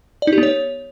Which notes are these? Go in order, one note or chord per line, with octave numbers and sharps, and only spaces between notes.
D5
D#4
G4
B3
C#5